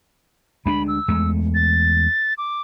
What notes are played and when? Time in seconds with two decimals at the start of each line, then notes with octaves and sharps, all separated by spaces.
0.66 D2 G#3 D4 B5
0.88 E6
1.08 E2 G#3 A3
1.54 A6
2.38 D6